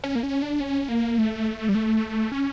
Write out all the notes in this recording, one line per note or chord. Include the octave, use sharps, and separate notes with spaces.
C#4
A#3
C#4
D4
C#4
A#3
A3
G3
A3
C#4